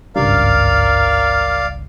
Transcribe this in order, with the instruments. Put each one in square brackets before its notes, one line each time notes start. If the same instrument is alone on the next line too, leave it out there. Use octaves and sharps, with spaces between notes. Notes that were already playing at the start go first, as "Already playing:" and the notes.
[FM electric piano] G#1 C#2 G2 [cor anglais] A#4 [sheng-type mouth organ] D5 F5